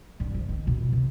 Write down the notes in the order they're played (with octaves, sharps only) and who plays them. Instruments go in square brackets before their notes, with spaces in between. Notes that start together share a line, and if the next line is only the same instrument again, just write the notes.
[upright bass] G2
F3
D#3
B2
C3